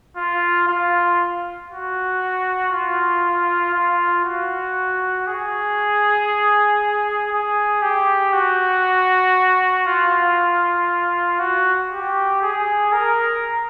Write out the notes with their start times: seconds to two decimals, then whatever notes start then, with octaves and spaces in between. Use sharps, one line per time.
0.17 F4
0.67 F4
1.70 F#4
2.72 F4
3.74 F4
4.25 F#4
5.27 G#4
7.32 G#4
7.82 G4
8.33 F#4
9.86 F4
11.39 F#4
11.90 G4
12.41 G#4
12.92 A#4